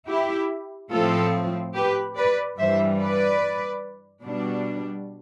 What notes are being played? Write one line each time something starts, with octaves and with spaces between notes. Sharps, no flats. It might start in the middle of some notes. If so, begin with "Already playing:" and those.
E4 G4
A2 F3 C4 F4 A4
G4 B4
B4 D5
G2 E3 G3 C5 E5
B4 D5
B2 G3 D4